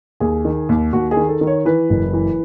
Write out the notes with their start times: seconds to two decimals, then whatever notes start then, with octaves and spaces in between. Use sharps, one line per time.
0.20 D#2 G#4
0.45 D#3
0.69 D#2
0.93 D#2 F#4
1.11 G#4
1.17 D#3
1.29 A4
1.41 D#3
1.47 C#5
1.65 E3 B4
1.90 F#1
2.14 E3